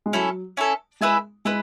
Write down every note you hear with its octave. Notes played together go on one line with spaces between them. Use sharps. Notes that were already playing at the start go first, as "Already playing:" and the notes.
G#3
F#3 C#4 E4 A4
C#4 E4 A4
G#3 E4 B4 E5 G#5
G#3 E4 B4